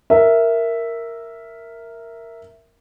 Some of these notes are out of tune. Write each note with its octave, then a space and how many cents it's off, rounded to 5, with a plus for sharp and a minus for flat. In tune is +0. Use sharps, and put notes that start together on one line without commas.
A#4 -5 E5 +0